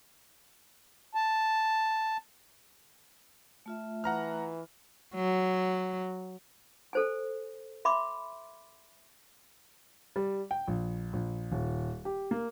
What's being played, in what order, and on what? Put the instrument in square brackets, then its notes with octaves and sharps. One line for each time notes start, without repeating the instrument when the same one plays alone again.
[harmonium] A5
[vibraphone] A3 F4 E5
[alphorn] E3 [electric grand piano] F#5 A#5 F6
[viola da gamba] F#3
[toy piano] A4 C5 G#5
E5 B5 C6 D6
[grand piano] G3
G5
A#1
A#1
D#1
G4
A#3